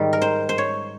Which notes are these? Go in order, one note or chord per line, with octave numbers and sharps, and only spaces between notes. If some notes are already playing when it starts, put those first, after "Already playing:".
Already playing: G#2 D#3 G3
A#4
C5
C5
C#5